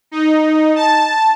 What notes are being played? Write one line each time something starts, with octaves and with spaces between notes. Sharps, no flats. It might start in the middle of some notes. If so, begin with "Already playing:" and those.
D#4
A5